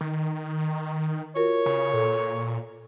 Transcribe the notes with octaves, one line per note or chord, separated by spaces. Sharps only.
D#3
F4 F#4 A#4 C#5
C#3
A#2 A4